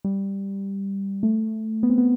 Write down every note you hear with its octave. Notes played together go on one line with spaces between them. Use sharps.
G3
A3
B3
C4
B3